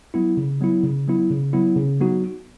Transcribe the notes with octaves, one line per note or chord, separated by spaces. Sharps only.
F#3 B3 E4
C#3
F#3 B3 E4
C#3
F#3 B3 E4
C#3
F#3 B3 E4
C#3
F#3 B3 D#4 F#4